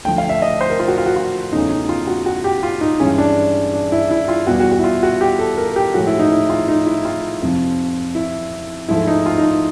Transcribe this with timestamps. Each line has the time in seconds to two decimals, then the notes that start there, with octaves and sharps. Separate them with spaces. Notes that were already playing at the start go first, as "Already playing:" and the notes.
0.05 D2 D3 F3 G5
0.18 F5
0.29 E5
0.42 D#5
0.61 C5
0.70 A#4
0.79 F4
0.88 F#4
0.98 F4
1.06 F#4
1.16 F4
1.52 E2 C#3 F#3 A3 D#4
1.71 D#4
1.89 F4
2.07 F#4
2.26 F#4
2.44 G4
2.63 F4
2.81 D#4
3.00 G2 E3 G#3 C#4
3.18 D4
3.73 D4
3.92 E4
4.11 E4
4.28 F4
4.47 E2 B2 G3 B3 F#4
4.60 F#4
4.72 F#4
4.79 E4
4.84 F4
5.03 F#4
5.21 G4
5.39 A4
5.57 A#4
5.76 G4
5.94 A2 F3 G#3 F#4
6.07 E4
6.19 D#4
6.32 E4
6.50 F4
6.68 D#4
6.87 E4
7.05 F4
7.42 F2 C3 F3
8.15 E4
8.88 G#2 F3 A3 E4
9.07 D#4
9.26 F4
9.38 D#4